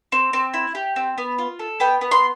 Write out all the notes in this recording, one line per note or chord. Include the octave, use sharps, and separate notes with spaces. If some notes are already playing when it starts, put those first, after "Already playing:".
C4
C4
E4
G4
C4
B3
F4
A4
B3 G5
B3
C6